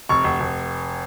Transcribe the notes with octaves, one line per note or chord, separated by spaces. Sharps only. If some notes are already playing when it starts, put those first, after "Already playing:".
F1 C#6
F1
F1